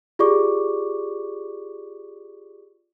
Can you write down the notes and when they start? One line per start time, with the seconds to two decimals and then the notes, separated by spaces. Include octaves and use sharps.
0.19 F4 G4 G#4 D5 C#6 D6